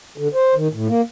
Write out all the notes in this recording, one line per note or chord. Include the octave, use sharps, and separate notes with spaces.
D3
C5
D#3
A2
A#3